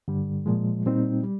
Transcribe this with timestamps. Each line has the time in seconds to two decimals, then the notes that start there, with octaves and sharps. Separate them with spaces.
0.08 G2 D3 G3
0.46 A#2 F3 G#3
0.86 A#2 G3 C4 D#4
1.23 G3